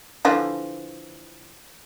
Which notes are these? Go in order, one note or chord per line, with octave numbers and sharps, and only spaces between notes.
D3 E3 F3